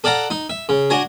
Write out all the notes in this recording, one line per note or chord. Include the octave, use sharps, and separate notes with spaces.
A4 D5 F5 F#5 A#5
D#4
E5
C#3
D4 F#4 G#5 A#5